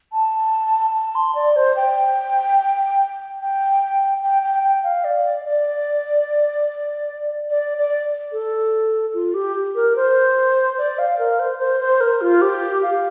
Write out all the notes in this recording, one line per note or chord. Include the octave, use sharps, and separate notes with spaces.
A5
A5
C6
D5
C5
G5
G5
G5
G5
G5
F5
D5
D5
D5
D5
A4
F4
G4
A#4
C5
D5
F5
A#4
C5
C5
C5
A#4
F4
G4
F5